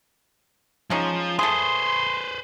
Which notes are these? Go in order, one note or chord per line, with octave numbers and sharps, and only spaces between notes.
F3 G#3 C#4 D#4
A3 G#4 B4 C5 C6